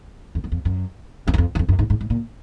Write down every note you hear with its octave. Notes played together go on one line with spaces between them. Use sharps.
F2
F#2
F2
F#2
F2
F#2
F2
F#2
F2
F#2
G#2
G#2
G#2
A#2